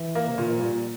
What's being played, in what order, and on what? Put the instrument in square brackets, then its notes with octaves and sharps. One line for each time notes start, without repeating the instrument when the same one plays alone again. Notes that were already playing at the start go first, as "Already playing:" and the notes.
Already playing: [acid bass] E3
[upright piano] A#3
[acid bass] C3
[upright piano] A#2 [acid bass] D3
[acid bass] E3
F3
[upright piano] A#2 [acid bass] G3